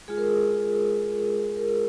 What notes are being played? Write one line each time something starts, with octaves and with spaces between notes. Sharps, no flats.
G#3 F4 G#4
A#4
G#4
A#4